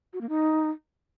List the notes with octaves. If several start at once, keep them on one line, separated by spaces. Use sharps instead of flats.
F#4
A#3
D#4